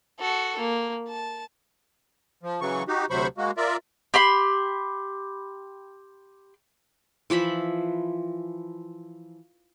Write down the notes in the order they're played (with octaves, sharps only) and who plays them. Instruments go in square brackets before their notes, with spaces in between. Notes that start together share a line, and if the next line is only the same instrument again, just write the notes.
[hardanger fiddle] F#4 A4
A#3
A5
[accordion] F3
C#3 E3 F#3 C#6
D#4 F#4 G4
D2 C3 F#3 C5 B5 C#6
G#3 A#3 F#4
F4 A#4 D5 E5
[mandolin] G4 B5 C6
[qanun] E3 F3 E5 B5